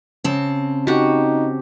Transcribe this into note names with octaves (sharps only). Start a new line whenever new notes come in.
C#3 C4 A5
D#4 F#4 G4